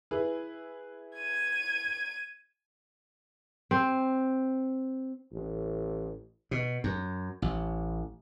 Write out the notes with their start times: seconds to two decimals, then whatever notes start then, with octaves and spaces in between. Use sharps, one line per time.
0.11 E4 G#4 B4
1.16 G#6 D#7
3.71 C4
5.32 A1
6.51 B2
6.84 F#2
7.42 A1